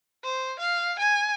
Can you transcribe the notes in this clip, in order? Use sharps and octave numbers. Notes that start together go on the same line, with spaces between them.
C5
F5
G#5